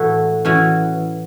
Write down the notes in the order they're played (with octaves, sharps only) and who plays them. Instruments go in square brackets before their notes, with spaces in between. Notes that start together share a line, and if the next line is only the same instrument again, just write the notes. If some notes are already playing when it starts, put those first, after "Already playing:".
Already playing: [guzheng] A2 E3 A3 F#4 A4
E3 C#4 F#4